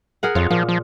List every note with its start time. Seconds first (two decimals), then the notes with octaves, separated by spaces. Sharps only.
0.23 G#4 A#4 F#5
0.35 F2 F4 C#5
0.51 A#2 F3
0.69 F3